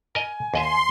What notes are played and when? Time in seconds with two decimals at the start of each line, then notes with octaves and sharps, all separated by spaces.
0.15 A#4 D#5 G#5
0.54 D#2 D#5 E5 C6